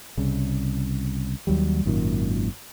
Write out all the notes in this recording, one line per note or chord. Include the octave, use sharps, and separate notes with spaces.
C2 C#3
D#2 F#3 G3
G#1 F#2 A#2 D#3